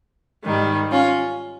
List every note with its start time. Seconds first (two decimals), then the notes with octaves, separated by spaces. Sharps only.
0.45 G#2 D#3 G3
0.91 C#4 F4